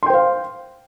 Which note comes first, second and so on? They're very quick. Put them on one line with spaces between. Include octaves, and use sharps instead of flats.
C6 G5 C5 F5